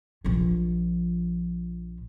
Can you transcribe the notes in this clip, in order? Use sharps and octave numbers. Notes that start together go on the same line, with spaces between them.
A#1 F3